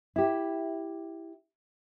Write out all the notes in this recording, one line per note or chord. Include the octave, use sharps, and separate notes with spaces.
E4 G4